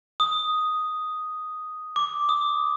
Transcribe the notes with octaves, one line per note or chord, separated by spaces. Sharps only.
D#6
D6
D#6